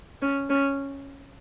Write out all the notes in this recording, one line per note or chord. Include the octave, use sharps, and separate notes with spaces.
C#4
C#4